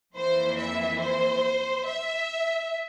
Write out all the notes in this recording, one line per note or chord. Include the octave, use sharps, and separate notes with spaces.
F2 E3 A#3 E4 C5
E5
C5
E5